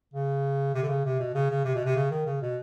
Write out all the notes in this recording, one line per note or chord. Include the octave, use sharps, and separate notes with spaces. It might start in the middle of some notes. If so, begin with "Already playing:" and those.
C#3
C3
D3
C#3
C3
B2
C#3
C#3
C3
B2
C3
C#3
D#3
C#3
B2